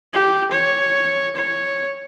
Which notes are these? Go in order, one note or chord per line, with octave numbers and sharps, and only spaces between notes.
G4
C#5
C#5